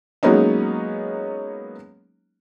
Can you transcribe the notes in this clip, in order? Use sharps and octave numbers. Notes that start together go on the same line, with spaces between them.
F#3 G#3 A#3 B3 C#4 D#4